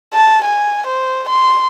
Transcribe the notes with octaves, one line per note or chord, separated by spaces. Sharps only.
A5
G#5
C5
C6